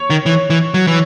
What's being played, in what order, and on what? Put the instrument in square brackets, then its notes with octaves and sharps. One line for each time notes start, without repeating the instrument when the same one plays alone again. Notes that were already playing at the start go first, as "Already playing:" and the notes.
Already playing: [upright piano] C#5
[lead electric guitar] D#3
E3
E3
F#3
E3